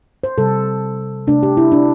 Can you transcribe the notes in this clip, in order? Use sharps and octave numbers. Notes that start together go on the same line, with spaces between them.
C5
C3 G3 A4
C3 A3 D4
G4
E4
D4